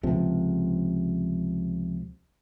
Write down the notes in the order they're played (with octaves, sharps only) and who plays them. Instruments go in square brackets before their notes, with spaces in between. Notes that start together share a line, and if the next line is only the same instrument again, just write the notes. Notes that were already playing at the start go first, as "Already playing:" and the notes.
[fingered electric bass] C#2 C3 F3